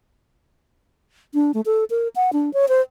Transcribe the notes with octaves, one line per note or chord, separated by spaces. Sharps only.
D4
A3
A4
A#4
F#5
D4
C#5
C5